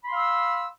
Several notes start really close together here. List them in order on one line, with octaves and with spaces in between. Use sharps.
B5 C6 F5 E6